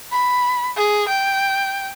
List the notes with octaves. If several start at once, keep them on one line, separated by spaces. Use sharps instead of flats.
B5
G#4
G5